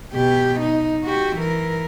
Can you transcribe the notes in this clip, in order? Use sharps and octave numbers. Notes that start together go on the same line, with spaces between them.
B2 G4
D#4
F#4 G4
E3 A#4